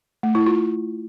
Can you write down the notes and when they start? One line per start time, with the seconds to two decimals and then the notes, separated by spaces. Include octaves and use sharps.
0.23 A3
0.35 E4
0.47 F4